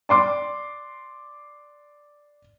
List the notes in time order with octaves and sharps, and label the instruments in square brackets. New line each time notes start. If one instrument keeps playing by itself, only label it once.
[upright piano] D5 C6 D6